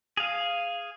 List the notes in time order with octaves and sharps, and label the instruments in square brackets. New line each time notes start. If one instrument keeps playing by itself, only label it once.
[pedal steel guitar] G#4 F5